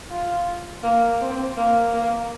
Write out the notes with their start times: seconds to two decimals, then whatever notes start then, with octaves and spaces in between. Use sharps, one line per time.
0.10 F4
0.83 A#3
1.21 C4
1.57 A#3
1.94 A#3